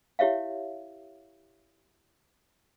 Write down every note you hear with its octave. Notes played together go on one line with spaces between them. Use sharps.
E4 G4 C#5 E5 F5